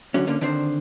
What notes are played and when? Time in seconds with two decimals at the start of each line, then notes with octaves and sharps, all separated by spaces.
0.14 D3 F#3 C#4
0.27 D3 A#3 C#4
0.41 D3 D#3 C4 D4 C5